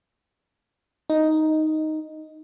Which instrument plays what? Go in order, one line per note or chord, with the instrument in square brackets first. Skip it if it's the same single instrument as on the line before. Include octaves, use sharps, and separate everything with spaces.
[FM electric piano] D#4